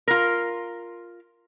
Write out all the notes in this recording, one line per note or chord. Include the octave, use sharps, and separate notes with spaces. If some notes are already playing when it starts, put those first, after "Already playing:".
F4 A#4